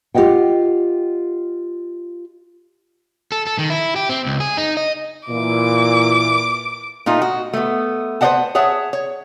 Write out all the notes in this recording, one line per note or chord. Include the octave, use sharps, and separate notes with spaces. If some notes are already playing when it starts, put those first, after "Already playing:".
F4 G4 D5 D#5 F#5 G5
A4
A4
D#3
E4
G4
C4
C#2
G#4
D#4
D#5
A#2 E3 E4 D6
A#2 A3 D#4 F4
F#4
A3 B3
B4 C5 D5 D#5 F#5 A5
G#4 C#5 E5 F#5 A5
C#5